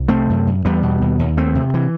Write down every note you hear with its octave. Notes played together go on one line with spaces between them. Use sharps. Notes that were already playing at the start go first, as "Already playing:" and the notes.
Already playing: C2
C3 A3 C4
F#2
F#2
E2 G3 B3
B2
D#2
D#2
E2 A3 C4
C3
E3